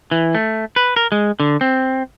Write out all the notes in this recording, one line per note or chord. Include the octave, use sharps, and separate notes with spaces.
E3
A3
B4
A#4
G#3
D3
C4